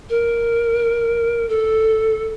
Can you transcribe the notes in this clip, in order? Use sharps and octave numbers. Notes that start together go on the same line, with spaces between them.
A#4
A4